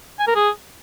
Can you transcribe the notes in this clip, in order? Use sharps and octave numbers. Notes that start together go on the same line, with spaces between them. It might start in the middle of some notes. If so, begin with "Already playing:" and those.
G#5
A#4
G#4